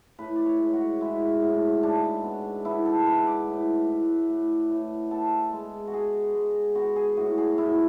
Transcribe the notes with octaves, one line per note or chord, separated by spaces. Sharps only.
A2 B4
D5
C#5
G#3
F#4
G#3 E4
A2
G#2 D4
B3
B3 E4
A4
G#2 B4
D5
A2
A2
A2
A2
B3 A4
G#3
F#4
G#3 G#4
G#3
B3 F#4
G#4
A2 F#4
G#4
A2 E4